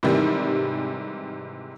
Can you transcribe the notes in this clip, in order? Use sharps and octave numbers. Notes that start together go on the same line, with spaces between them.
G#2 C3 D#3 E3 G3